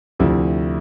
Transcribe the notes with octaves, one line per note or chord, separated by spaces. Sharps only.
D2 C3 F3 E4